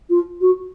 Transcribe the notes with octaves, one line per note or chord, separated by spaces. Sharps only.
F4
F#4